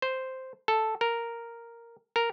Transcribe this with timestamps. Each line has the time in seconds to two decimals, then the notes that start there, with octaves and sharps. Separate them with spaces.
0.02 C5
0.68 A4
1.01 A#4
2.16 A#4